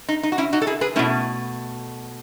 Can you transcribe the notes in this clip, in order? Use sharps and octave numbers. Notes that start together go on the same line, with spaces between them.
D#4
D#4
F#4
C#4 E4
D#4 F#4
A4
E4 G#4
G#4 B4
B2 A3 C#4 E4